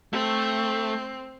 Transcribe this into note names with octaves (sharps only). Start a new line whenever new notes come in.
A3 C4